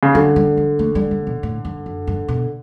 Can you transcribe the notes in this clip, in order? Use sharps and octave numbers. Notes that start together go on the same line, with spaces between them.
C#3
D3 F#3
G3
G3
A3
G3
G3
B2
A2
G2
F#2
G2
B2